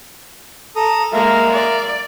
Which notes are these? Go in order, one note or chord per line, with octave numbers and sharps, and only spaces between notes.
A4 A#5 D#6
G#3 A#3 A#4 E5 F5
D5